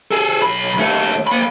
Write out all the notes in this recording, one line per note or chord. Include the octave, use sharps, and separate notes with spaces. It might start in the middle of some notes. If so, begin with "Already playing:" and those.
G#4 A4
B1 B5
D#2 A3
A#3 B5